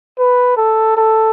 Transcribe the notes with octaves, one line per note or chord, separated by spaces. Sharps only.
B4
A4
A4